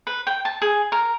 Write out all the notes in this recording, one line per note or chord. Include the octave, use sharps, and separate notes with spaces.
B4
G5
A5
G#4
A#4